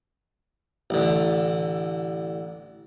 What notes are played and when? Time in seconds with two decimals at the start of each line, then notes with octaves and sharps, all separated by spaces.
0.90 A1 D3